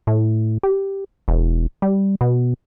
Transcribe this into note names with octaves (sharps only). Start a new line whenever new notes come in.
A2
G4
E1
G3
B2